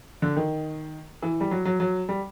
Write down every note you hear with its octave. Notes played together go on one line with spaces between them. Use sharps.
D3
D#3
E3
G3
F#3
F#3
F#3
G3